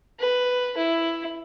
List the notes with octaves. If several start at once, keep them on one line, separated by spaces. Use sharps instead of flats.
B4
E4